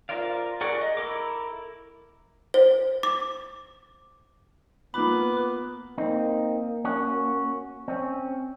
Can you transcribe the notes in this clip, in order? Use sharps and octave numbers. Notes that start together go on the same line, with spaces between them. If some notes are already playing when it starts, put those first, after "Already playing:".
F4 A#4 C5 D5 F5
G#4 A#4 D5 F#5 C#6
D#5
E4 A4 A#4 D6
C5
D6
A#2 A#3 B3 B4 B5 D6
A#3 C4 D#4
C#4 F#4
C4 C#4